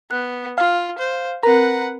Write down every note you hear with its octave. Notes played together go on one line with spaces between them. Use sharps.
B3 F#6
F4 F5
C5
C4 A#4 B4 F#5 A#5